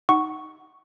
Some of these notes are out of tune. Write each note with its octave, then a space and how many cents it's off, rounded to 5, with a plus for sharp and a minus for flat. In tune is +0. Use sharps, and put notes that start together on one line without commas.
D#4 +0 F#5 +15 C#6 +0